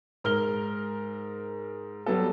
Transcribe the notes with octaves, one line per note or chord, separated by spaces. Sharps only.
G#2 A#4 F6 G7
F#3 G3 B3 A4